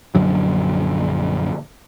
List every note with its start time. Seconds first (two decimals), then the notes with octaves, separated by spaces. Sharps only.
0.15 A#1 F#2 D3 F#3